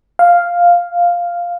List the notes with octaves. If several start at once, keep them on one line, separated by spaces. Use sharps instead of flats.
F5